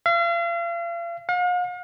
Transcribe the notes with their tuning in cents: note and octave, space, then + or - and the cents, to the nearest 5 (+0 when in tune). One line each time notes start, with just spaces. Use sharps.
F5 -40
F5 +45